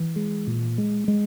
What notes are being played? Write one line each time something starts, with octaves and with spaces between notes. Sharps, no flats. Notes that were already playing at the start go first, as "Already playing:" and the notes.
Already playing: E3
G#3
A#2
G#3
G#3